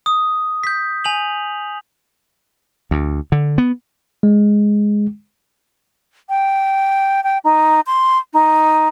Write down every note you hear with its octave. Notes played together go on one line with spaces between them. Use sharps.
D#6
G6 B6
G#5 F7 F#7
D2
D3
B3
G#3
G5
G5
D#4
C6
D#4